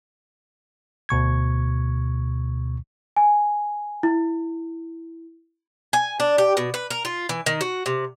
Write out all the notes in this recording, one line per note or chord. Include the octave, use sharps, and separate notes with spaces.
D2 B2 C#6 G#6
G#5
E4
G#5
D4
G4
B2
B4
A#4
F4
E3
D#3
F#4
C3